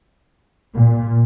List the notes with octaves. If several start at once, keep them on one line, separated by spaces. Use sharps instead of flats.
A#2